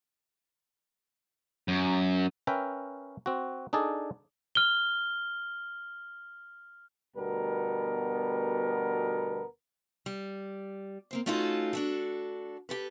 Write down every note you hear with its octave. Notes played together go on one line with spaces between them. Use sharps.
F#2
C#4 A#4 B4 E5 G5
C4 F#4
D4 D#4 G#4 A4 D5
F6 G7
D2 B2 G3 B3 A4 A#4
G3
A#3 C4 C5
A3 C#4 D#4 F4 F#4 A4
D4 F#4 A4
G4 A4 B4